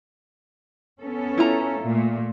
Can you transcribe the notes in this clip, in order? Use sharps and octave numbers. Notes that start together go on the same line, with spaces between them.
B3 C#4 A4
E4 F4 A#5
A#2 A3